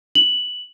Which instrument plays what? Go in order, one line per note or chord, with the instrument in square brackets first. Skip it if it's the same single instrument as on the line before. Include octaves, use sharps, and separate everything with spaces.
[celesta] F#7